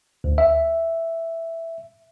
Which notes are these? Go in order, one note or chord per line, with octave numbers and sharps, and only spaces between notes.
D2
E5